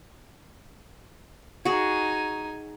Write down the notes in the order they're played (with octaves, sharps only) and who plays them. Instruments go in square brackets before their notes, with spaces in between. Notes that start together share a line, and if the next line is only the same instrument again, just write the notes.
[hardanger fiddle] D#4 G#5 [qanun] F#4 G#4